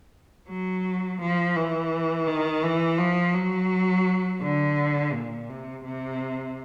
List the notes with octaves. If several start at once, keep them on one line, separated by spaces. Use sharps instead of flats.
F#3
F3
E3
D#3
E3
F3
F#3
D3
A#2
C3
C3